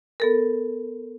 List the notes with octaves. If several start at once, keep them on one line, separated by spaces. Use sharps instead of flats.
B3 A4 A#4